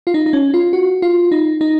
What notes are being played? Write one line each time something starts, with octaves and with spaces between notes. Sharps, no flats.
F4
D#4
D#4
C#4
F4
F#4
F4
D#4
D#4